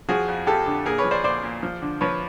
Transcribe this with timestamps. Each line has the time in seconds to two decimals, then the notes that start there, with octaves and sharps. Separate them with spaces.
0.09 F3 F#4 G#4
0.28 F2
0.47 F2 G4 A4
0.66 D3
0.86 A#2 G#4 A#4
0.98 B4 C#5
1.04 F3
1.11 C5 D5
1.24 A#2 C5 D5
1.43 A#2
1.63 F3
1.82 D3
2.01 F3 B4 C#5